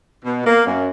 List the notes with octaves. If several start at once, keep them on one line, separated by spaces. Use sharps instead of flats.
B2
A#3
F#2